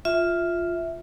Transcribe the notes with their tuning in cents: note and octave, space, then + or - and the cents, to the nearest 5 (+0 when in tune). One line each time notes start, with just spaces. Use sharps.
F4 +0 E5 +0